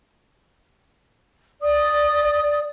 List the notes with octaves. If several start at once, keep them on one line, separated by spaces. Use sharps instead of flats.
D5 D#6